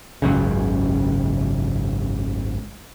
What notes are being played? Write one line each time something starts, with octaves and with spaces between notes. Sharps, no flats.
G#1 C#2 F#2 C#3